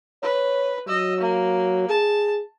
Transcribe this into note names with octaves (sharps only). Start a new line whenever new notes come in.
B4 C#5
F#3 D#5 E6
A#3
G#4 A5